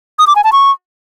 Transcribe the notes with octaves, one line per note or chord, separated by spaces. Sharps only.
D#6
D6
G#5
A5
C#6